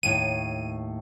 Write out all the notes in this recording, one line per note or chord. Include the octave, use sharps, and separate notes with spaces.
D#2 A2 D#7